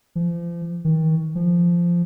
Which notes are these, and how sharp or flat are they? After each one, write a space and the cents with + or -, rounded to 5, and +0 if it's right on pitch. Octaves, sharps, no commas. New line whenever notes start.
F3 -35
D#3 +35
F3 -10